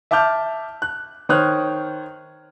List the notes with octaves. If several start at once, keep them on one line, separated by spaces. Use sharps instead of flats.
E5 A5 D6 F6 G6
F#6
D#3 C5 C#5 D#6 F6 F#6